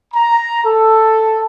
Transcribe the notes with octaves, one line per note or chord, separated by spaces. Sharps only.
A#5
A4